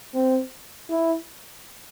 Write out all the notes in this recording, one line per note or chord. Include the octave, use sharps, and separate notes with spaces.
C4
E4